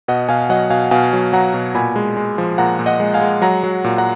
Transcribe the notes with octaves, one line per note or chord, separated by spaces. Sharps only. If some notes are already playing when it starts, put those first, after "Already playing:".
B2 D#5 F#5
B2 F5 G#5
F#3 D#5 F#5
B2 F5 G#5
B2 F5 G#5
F#3
F#3 F#5 A#5
B2
A#2 G#5 B5
G#3
G#3
F3
A#2 F#5 A#5
A#2
D#5 F#5
G#3
F5 G#5
G#3
F#3 F#5 A#5
F#3
A#2
F#5 A#5